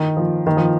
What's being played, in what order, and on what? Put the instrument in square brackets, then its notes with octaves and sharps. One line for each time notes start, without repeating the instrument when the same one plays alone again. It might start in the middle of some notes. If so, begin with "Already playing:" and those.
Already playing: [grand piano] D#3
F3
D#3
F3